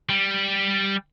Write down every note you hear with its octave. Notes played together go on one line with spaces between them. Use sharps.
G3